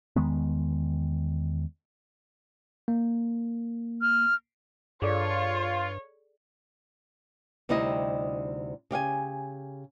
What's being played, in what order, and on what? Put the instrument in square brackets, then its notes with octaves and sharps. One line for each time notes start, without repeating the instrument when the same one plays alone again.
[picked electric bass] E2 D#3 G#3 B3
[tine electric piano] A#3
[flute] F6
[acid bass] G2 [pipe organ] F4 [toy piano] G#4 A4 D5 [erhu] C#5
[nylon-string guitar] D2 C3 G3 D#4 E4 D#5
C#3 G4 F5 G#5